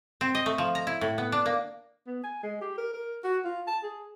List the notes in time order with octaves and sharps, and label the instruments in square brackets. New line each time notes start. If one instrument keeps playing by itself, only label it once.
[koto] C4
D#5
A3
F3
A#5
E4
A2
B3
D4
A#3
[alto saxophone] B3
G#5
G#3
G4
A#4
A#4
F#4
F4
A5
G#4